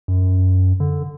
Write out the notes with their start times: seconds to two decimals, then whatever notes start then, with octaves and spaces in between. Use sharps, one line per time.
0.08 F#2
0.80 D3